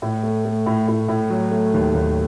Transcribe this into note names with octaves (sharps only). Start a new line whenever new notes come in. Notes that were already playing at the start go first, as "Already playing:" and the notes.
A2
A3
A3
A2
A2
A2
F#3
A3
D#2
D#2